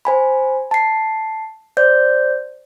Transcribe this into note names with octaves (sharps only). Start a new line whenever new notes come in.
C5 G#5 B5
A5 C7
C5 D5 G6